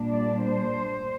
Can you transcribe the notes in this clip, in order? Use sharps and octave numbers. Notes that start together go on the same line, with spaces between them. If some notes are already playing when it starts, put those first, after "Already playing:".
Already playing: A#2 G3 A#3 D4
D5
C5